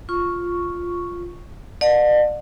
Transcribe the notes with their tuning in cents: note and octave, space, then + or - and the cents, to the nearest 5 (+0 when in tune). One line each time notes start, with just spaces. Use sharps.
F4 +0 C#6 +0
D5 +40 F#5 -35 A5 +0